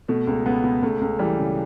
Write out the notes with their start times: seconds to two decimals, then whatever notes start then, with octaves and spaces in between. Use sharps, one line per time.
0.08 B2 A3
0.27 C#2
0.46 C#2 B3
0.64 B2
0.83 C#2 A3
1.01 C#2
1.19 E3 G3
1.39 C#3